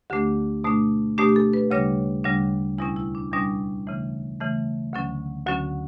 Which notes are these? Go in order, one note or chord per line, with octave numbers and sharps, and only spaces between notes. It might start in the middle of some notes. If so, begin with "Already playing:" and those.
D2 D3 A3 D4 G4
B2 A3 D4
B2 A3 D4 G4
G4
A4
B4
D2 C#3 G3 D4 C#5
D2 C#3 G3 D4
E2 B2 G3 C#4 E4
E4
D4
E2 B2 G3 C#4 D4
C#3 E3 A3
C#3 E3 A3
D2 D3 F#3 C#4
D2 D3 F#3 C#4 F#4